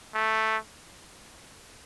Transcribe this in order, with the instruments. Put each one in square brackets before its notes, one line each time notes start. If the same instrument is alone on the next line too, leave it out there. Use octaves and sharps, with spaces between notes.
[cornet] A3